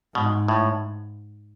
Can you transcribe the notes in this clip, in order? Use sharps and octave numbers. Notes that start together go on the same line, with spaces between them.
G#2 B2
A2